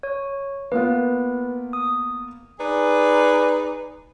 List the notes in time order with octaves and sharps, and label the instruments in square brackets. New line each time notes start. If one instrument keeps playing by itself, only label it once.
[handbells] C#5
[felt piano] A#3 B3 F4 [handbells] B4
[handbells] D#6
[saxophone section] D#4 G#4 B4 D5